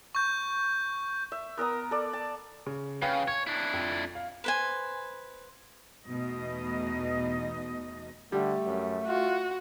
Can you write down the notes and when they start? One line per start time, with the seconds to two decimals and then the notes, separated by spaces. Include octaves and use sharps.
0.15 C#6 G6
1.32 E5
1.57 B3 A#4 A#5 D#6
1.91 A4 D5
2.13 A5
2.67 C#3
3.02 C#3 B4 F5 G5
3.28 C#5 G#6
3.47 D4 E4
3.73 F2
4.15 F5
4.44 B4 C5 G#5
6.08 E2 B2 A3 D#4 D#5
8.32 D3 G3 A3
8.66 F#2
9.07 F4 F#4